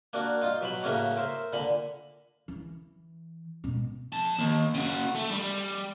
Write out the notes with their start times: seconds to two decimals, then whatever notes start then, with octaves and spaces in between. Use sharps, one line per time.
0.13 A#3 D4 F#4 A#4
0.42 D#4 F4
0.61 B2 F#3 B5
0.82 A2 C#3 A#3 C#4 F#4 A#5
1.17 A#4 C5 E5
1.53 A#2 D3 A#5 B5
2.48 E3
3.64 G#2 B2
4.12 F2 A5
4.39 D#2
4.74 C#3 F#4
5.15 A3
5.31 G3